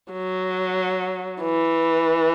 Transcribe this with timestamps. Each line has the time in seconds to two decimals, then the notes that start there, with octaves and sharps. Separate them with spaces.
0.13 F#3
1.43 E3